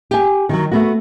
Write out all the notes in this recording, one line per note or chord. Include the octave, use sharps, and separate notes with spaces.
G4 G#5
D#3 F#3
A3 B3 F#4